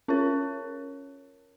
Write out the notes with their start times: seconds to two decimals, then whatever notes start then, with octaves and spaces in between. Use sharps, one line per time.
0.08 C#4 F4 A#4 C#5